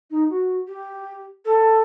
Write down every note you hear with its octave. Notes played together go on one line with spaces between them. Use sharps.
D#4
F#4
G4
A4